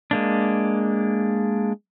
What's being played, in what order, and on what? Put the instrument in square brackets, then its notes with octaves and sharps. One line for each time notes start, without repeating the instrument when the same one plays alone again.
[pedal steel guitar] G#3 A#3 D4